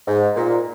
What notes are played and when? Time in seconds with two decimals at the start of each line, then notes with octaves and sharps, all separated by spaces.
0.08 G#2
0.36 A#2